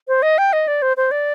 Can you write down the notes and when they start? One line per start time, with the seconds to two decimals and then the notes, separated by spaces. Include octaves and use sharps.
0.08 C5
0.22 D#5
0.38 G5
0.53 D#5
0.68 D5
0.82 C5
0.97 C5
1.11 D5